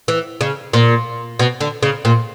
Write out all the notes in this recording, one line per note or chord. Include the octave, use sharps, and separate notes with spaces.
E3
C#3
A#2
B2
D3
C#3
A#2